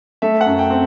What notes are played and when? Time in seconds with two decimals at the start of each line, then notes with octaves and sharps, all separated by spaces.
0.22 A3 E5
0.41 F#5
0.46 F#2
0.59 G5
0.70 C4